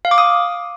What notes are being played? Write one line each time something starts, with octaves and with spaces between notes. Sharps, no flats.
F5
D6
D#6